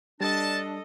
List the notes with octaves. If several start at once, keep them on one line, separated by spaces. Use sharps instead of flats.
G3 D4 A4 D#5 A5